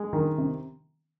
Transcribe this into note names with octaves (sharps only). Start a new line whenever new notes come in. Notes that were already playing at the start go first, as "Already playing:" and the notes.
Already playing: G#3
D#3
C3